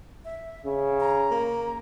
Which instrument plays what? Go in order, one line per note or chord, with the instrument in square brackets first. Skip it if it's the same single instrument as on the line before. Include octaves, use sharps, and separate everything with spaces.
[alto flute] E5
[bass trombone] C#3
[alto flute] A#5
[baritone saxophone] A#3